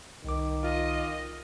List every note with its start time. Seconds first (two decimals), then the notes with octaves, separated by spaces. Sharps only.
0.25 C2 D#3 D6
0.63 F4 D#5